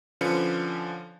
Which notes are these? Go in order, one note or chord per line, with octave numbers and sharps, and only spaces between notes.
D3 F3 C#4 B4 C#7